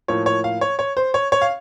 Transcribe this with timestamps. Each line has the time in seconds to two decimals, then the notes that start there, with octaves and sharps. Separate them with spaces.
0.08 A2 F3 A#3 C#5
0.26 C#5
0.44 F5
0.61 C#5
0.79 C#5
0.97 C5
1.14 C#5
1.32 C#5
1.42 F5